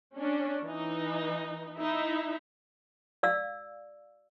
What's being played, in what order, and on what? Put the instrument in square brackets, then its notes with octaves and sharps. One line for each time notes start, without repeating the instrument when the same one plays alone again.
[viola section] C#4 D4
E3 D#4
D#4 E4 E5
[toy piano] D5 F5 E6